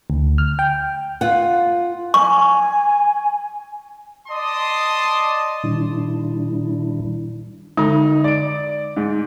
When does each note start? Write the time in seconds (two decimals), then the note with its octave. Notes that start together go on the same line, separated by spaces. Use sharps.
0.10 D2
0.38 F6
0.59 G5
1.21 F4 F#5
2.14 G#5 C#6
4.29 D5 D#5 A5 C6 D#6
5.64 A#2 D#3 G3 D4 E4
7.77 D3 G#3 D#4
8.24 D5 D7
8.97 G#2